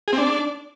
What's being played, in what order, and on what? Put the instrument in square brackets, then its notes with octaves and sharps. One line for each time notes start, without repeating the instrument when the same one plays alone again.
[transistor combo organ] G#4
C4
D4